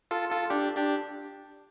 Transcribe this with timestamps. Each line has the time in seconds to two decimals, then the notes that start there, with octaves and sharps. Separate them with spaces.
0.11 F4 A4
0.31 F4 A4
0.50 D4 G4
0.76 D4 G4